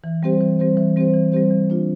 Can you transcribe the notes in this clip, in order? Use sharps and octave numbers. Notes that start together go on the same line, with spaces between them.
E3
G3 C4 G4 C5
E3
G3 C4 G4 C5
E3
G3 C4 G4 C5
E3
G3 C4 G4 C5
E3
A#3 D4 F4